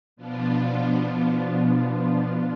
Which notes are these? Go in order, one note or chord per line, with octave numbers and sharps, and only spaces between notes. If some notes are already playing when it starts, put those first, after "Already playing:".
B2 F3 B3 D4 F4